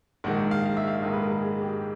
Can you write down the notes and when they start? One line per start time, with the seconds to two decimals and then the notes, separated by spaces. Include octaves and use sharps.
0.24 A#1 G#2 D#3 G#3 F#5
0.51 F5
0.65 F5
0.77 E5
0.87 F5
0.95 E5
1.02 A#1 G#2 D#3 G#3 D#5
1.13 B4
1.22 A#4
1.42 G#4
1.57 G#4
1.61 G4